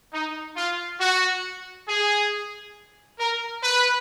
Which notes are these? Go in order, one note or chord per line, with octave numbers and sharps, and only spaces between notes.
D#4
F4
F#4
G#4
A#4
B4